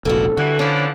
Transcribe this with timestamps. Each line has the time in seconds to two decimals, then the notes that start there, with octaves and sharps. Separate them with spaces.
0.05 F1 A#1 A#3 B3 F#4 A4
0.37 D3 E3 G3 F#4
0.59 E3 F3 C#4 D4 B4